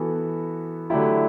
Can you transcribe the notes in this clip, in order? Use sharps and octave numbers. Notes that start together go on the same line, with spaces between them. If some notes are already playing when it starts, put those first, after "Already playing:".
Already playing: E3 B3 F#4 A4
D3 F#3 A3 E4 G4